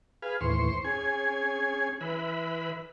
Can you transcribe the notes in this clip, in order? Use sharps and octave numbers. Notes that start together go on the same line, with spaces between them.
G#4 B4 F5
D#2 A2 E3 C5 C6 C#6
C#4 G#4 C#5 G#5
E3 B4 E5 B5